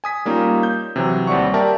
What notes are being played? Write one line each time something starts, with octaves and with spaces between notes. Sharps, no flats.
G#5 D#6 B6
G3 A#3 C#4 D#4 F4
G6
C3 E3 F#3
D#2 G3 C4 D5 F#5 C#6
G4 A#4 D5 E5 G5 A5